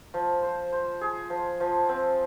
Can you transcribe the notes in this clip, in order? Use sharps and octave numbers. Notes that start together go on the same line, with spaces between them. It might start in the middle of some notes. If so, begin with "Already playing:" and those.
F3
C5
C5
G#4
F3
F3
C4